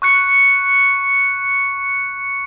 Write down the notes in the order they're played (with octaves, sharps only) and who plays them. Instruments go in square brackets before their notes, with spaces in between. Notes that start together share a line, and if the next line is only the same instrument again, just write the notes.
[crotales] C#6 F#6 C#7